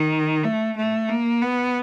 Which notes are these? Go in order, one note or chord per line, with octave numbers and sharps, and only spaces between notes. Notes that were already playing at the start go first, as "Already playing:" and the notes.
Already playing: D#3
A3
A3
A#3
B3